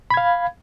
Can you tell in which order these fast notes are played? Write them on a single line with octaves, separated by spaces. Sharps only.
B5 G#6 F5